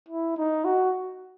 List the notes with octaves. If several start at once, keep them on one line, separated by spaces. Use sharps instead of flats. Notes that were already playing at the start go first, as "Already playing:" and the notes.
E4
D#4
F#4